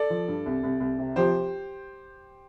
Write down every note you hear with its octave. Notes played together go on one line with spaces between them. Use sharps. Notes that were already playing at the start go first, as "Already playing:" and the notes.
Already playing: A4 D5
F3
G2
C2
C2
C2
C3
F3 G4 C5